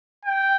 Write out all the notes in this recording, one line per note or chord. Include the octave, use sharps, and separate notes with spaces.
G5